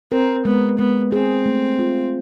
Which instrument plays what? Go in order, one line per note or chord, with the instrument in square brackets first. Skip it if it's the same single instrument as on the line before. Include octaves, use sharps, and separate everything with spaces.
[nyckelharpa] C4 [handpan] A#4
[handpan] G#3 [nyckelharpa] B3
[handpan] G#3 [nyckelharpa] B3
[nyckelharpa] C4 [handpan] G#4
[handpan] A3
F4